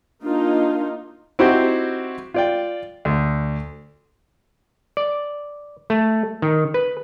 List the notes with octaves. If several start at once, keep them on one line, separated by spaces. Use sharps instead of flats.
A#3 D4 D#4 F4
C4 D#4 E4 F#4 G4 C5
F4 D5 G5
D2
D5
A3
D#3
B4